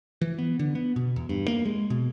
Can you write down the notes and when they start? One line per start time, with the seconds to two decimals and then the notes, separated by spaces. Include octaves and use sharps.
0.21 E3
0.38 B3
0.59 D3
0.75 B3
0.96 B2
1.16 E2
1.29 G2
1.48 A#3
1.65 G#3
1.90 B2